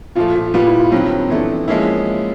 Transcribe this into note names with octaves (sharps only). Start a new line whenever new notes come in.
A#2 F3 A3 F4
F4
A#2 G3 B3 F4
E4
F4
G2 D#3 F#3 C4
E3 A3 B3 D4
F3 G#3 A#3 C#4 E4